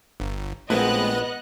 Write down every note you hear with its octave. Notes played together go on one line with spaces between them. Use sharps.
G1
A#1 A2 G#3 B3 C4 B4 D#5 F#6